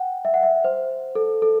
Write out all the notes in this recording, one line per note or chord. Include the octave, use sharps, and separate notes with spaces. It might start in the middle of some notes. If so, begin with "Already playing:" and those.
Already playing: F#5 G5
E5
F#5
E5
C5
A4
A4